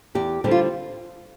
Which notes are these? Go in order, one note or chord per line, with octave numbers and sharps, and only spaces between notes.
E2 G4
D3 G3 C4 G4
F4